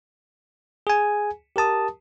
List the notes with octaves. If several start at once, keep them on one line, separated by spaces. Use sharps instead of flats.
G#4 G#5
G4 A#4 A5 D#6